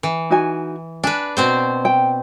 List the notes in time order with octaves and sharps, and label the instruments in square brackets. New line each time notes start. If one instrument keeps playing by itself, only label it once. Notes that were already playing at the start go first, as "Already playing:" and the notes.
[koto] E3
[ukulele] D#4 F#4 G#5
[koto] D4 B4 [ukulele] G#5
[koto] B2 C4 C5
[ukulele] G5